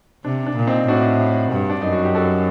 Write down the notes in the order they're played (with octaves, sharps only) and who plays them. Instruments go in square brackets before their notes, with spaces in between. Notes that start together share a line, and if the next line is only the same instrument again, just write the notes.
[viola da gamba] C3 [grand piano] D4
[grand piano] D4
[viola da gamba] A#2
[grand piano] C4 D#4
[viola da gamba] A2 [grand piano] D4 F#4
[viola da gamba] G2
[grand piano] D4
[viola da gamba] F#2 [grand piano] D#4
[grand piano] F#4
G4
F#4 A4